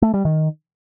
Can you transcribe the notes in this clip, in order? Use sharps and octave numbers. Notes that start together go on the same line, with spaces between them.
A3
G3
D#3